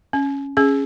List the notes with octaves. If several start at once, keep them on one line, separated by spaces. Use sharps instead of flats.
C#4
C#4 G#4